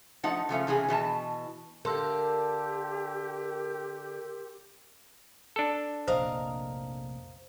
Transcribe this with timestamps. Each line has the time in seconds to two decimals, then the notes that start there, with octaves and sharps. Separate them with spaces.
0.23 F3 A3 D#4 F#5
0.49 C#3 F3 A3 F5
0.67 C3 E3 C#4 G#4
0.88 B2 E3 B4 A5
1.85 D3 D4 G4 A4 A#4 F5 C6 E6
5.56 D4 A4
6.07 F1 A#1 A#4 C5 D#5 F5